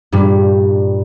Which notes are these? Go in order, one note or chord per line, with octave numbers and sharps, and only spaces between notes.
G2 A#2 G3